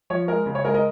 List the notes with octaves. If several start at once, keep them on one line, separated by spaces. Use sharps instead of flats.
F3 C#5
G#3 A#4
C#3
C#5
G#3 A#4 D#5
A#4 D#5